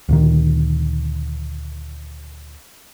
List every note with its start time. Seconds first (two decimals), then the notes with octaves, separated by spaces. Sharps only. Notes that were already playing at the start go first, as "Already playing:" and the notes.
0.09 D2 A#2 D#3